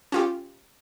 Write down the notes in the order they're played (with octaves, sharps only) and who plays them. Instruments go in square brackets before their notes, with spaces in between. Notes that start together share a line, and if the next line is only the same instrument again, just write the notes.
[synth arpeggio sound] C#4 F4 G4